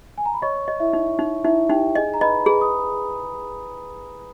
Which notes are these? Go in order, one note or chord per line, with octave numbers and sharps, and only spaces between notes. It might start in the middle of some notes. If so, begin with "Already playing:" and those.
G#5
A#5
B5
C#5 D#5 C#6
D#5
E4 E5
D#4
D#4
D#4 E4 E5
D#4 G4 G5
G#4 D#5 G#5
A#5
B4 D#5 B5
G#4 B4 B5
D#6